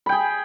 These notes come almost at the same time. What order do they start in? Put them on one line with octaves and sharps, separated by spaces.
B5 G5 G#4